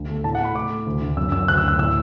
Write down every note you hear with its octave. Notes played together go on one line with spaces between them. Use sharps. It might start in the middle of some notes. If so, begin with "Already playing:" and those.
Already playing: D2
A3
A2 A5
F#5
A3 B5
A2 D6
A3
D2
D2
F#2 E6
F#2 E6
D2 F#6
E6
D2 F#6
A2 E6